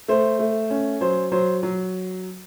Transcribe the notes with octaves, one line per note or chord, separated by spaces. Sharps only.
A3 C5
A3
C#4
F#3 C5
F#3 C5
F#3